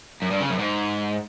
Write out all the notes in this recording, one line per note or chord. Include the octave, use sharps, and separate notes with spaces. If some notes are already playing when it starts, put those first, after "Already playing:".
F#2
G2
C#3
F#2
G#2